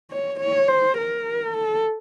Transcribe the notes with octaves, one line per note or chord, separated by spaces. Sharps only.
C#5
C#5
C5
A#4
A4